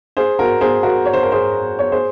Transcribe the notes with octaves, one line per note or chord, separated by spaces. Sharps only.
G#4 C5
F#4 A#4
G#4 C5
F#4 A#4
C#5
C5
A#4
G#4 C5
C#5
G#4 C5